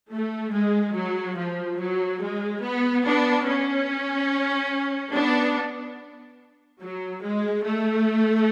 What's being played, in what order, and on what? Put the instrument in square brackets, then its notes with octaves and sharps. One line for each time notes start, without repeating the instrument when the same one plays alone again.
[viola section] A3
G#3
F#3
F3
F#3
G#3
B3
B3 D4
C#4
B3 D4
F#3
G#3
A3